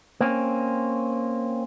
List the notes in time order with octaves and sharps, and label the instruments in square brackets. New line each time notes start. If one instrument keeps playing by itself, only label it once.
[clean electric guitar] A#3 C4 C#4